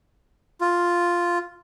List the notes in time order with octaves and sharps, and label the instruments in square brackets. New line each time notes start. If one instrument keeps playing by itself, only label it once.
[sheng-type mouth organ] F4